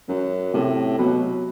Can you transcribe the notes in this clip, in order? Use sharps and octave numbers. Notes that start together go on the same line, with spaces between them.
F#2 F#3
A2 C3
B2 F#3